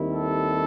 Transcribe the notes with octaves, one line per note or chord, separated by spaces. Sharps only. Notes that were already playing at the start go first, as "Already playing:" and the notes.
Already playing: D#2 D#3 G3 C4 E4
A4